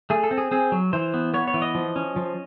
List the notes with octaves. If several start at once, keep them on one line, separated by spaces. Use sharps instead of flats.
A3 G#4
A4
C4
G#4
C4 G#4
F#3
E3 C5
B3
B3 C#5
C#5
E3
D#5
F3
C#4
F3